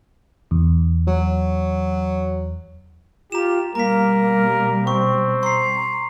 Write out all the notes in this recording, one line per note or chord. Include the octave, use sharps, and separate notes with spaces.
E2
F#3
F4 G4 A#5 E7
B2 G3 A#3 A#4 A#5 B6
C4 C#6
A#5 C6 C7